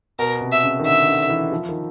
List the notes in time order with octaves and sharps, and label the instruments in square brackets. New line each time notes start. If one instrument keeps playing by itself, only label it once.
[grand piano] B2 [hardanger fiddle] A#4
[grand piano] C3
[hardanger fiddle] E5
[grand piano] C#3
D#3
[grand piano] D3 [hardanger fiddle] E5
[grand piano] D3
E3
F3
D#3